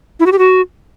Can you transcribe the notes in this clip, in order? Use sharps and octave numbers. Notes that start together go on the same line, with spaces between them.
E4
F#4
G4
F#4